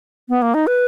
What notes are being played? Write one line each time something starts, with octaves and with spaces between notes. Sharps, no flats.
B3
A#3
D#4
B4